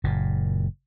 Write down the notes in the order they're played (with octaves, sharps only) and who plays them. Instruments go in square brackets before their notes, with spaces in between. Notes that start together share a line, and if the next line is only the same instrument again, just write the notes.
[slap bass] F#1 A#2